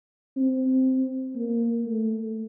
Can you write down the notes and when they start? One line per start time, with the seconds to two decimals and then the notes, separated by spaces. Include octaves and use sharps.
0.37 C4
1.36 A#3
1.86 A3